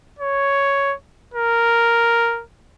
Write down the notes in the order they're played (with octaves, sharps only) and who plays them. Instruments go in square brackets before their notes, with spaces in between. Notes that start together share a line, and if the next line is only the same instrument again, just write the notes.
[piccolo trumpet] C#5
A#4